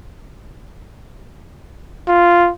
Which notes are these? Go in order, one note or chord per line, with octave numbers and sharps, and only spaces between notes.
F4